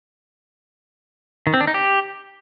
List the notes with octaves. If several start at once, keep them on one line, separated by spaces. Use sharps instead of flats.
D#3
C4
D4
D#4
G4